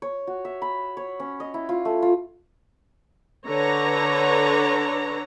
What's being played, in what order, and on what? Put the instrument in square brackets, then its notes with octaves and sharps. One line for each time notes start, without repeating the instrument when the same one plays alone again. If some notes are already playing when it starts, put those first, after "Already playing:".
[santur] C#5
F#4
E5
B5
C#5
C#4
D#5
E4
F4
A3
F4
[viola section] D3 B4 C#5 A#5